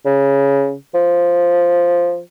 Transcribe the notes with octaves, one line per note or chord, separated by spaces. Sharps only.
C#3
F3